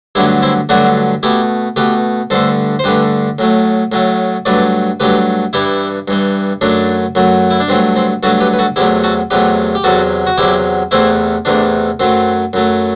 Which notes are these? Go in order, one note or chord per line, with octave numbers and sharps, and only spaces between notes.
G2 D3 F#3 A3 E4 G4
C4 E4
G2 D3 F#3 A3 D4 F#4
B2 A3 E4 G4
B2 A3 G4 B4
G2 D3 A3 A4 C5
C5
G2 D3 A3 G4 B4
A2 F#3 A3
A2 F#3 A3
G2 F#3 A3 B4 D5
G2 F#3 A3 G4 B4
G2 E3 G3 E4 G4
G2 E3 G3
F#2 F#3 A3 D4
F#2 F#3 A3
E4
D4
G2 F#3 A3 C4
C4
G2 F#3 A3 F#4 A4
G4 B4
B4
F#4 A4
E2 C3 F#3 A3 E4 G4
F#4 A4
E2 C3 F#3 A3 G4 B4
G4
E2 C3 F#3 F#4 A4
F#4
E2 C3 F#3 E4 G4
E2 C3 E3 A3 C4 E4
E2 C3 E3 A3 D4
F#2 F#3 A3 C4
F#2 F#3 A3